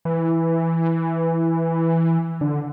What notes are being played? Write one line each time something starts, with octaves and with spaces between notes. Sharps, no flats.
E3
D3